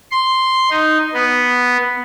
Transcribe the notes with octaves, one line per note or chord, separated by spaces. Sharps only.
C6
D#4
B3